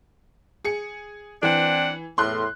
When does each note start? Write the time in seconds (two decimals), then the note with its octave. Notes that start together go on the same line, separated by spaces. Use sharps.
0.64 G#4 C#7
1.43 E3 C4 D4 F#5
2.18 E2 A2 C6 F#6